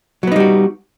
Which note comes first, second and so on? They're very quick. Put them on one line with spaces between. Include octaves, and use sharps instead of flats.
F#3 B3 D#4 G3 F#4